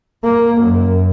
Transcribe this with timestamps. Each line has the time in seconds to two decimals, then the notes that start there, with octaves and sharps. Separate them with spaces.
0.23 A#3
0.61 F#2